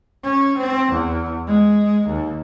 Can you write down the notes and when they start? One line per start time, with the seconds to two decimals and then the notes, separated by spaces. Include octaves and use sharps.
0.24 C#4
0.58 C4
0.92 E2
1.47 G#3
2.08 D#2